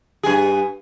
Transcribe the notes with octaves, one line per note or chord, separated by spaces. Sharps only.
G2 G#4